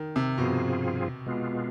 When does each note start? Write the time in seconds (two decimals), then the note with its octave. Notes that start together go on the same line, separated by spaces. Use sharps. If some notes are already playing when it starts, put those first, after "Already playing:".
Already playing: D#3
0.16 C3
0.38 G2 B2 F3 C4 F4 G#4
1.26 B2 G#3 B3 F4